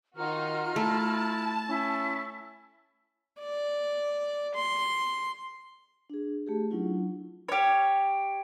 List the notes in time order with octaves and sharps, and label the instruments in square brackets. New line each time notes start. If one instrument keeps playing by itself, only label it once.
[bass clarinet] D#3 [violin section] D#4 F#4 [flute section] F4 A#5 F6
[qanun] A3 [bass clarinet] E4 [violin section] A5
[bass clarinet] C#4 [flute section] E4
[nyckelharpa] D5
C6
[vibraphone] D4 G#4
A3 G4 G#4
F#3 C#4 D4 E4 F4
[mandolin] G4 C#5